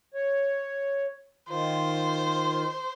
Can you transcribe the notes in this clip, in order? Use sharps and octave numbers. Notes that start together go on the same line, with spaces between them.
C#5
D#3 F4 C5